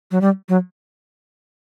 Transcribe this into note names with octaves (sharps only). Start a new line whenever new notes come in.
F#3
G3
F#3